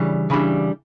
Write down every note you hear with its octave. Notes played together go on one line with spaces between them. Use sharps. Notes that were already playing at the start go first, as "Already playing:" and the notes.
Already playing: C#3 E3 G3 D4
C#3 E3 G3 D4 B5